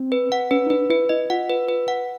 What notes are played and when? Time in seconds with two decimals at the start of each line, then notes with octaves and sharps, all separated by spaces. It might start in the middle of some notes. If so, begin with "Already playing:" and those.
Already playing: C4
0.12 B4
0.32 F#5
0.51 C#4 B4
0.66 D#4
0.70 D4 B4
0.90 E4 B4
1.09 E4 D#5
1.30 F4 F#5
1.50 B4
1.69 B4
1.88 F#5